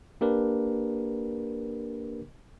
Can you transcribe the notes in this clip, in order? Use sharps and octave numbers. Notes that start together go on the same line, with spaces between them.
A#3 D4 G4 A#4 B4